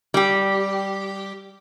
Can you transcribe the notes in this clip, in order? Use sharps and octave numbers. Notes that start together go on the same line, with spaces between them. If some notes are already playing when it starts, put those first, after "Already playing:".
G3 G4